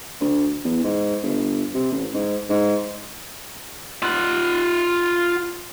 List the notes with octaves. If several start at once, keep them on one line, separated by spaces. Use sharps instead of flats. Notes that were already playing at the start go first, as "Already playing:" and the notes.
D2
E2
G#2
G1
C3
A1
G#2
G#2
F4 F#5